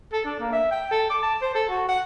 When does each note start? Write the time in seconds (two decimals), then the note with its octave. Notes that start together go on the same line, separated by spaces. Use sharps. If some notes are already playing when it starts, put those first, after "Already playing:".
0.12 A4
0.25 D4
0.40 A#3
0.52 E5
0.71 G5
0.91 A4
1.10 D6
1.23 A5
1.42 C5
1.55 A4
1.69 F#4
1.89 F#5